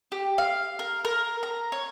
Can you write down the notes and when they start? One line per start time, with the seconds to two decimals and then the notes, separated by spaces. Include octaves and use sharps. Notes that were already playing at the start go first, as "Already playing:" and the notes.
0.12 G4
0.38 F5
0.79 A#4
1.05 A#4
1.43 A#5
1.72 C#5